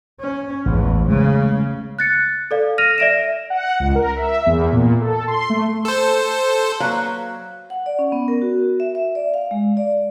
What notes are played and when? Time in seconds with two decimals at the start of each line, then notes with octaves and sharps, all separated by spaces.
0.20 C#4
0.66 A1 E2 G#2
1.08 C#3 G#3 A3
1.99 F#6 A6 C#7
2.51 A4 D5 F5
2.78 F6 A#6 D#7 F7
2.98 D5 E5 A#6 D7 E7
3.50 F#5
3.80 C#2
3.95 A#4
4.17 E5
4.46 E2
4.73 A#2
5.01 A4
5.28 C6
5.50 A3
5.85 A4 C5
6.80 F#3 A#3 B4 C#5 F5
7.70 F#5
7.86 D5
7.99 C#4
8.12 B3
8.28 A#4
8.42 F#4
8.80 E5
8.95 E5
9.15 D5
9.34 F5
9.51 G#3
9.77 D5